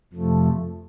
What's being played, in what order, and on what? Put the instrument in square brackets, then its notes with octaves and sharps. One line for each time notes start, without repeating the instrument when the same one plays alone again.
[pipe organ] F2 C3 F3 A3